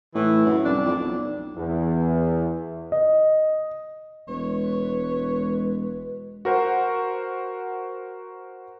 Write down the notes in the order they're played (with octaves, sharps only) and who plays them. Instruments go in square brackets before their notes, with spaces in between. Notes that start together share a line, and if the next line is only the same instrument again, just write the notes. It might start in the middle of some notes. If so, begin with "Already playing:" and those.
[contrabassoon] A2 [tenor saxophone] E3
[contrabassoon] F#2
[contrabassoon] C2 [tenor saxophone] D4
[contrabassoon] F2
B1
[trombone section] E2
[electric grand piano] D#5
[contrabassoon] E1 [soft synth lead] G#3 [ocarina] B4 [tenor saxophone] C#5
[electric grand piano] F#4 A#4 C5 F#5